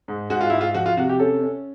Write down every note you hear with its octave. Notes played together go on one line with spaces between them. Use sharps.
G#2
G#2 F#4
F4
G#2 E4
F4
F3 F#4
F4
C3 F#4
G4
C#4 A4
C#4